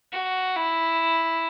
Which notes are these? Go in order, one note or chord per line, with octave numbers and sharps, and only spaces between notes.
F#4
E4